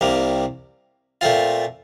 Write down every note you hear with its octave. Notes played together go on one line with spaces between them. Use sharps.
C2 C3 G3 A#3
A#2 A3 C4 F4